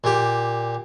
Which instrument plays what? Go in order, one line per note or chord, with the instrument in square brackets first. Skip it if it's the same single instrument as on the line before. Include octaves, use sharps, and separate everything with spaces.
[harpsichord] A#2 G4